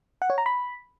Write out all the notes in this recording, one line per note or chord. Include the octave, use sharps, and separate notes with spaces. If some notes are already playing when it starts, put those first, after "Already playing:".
F#5
C#5
A#5
B5